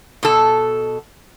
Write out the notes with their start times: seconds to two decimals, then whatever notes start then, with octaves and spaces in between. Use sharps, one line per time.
0.23 B2 A4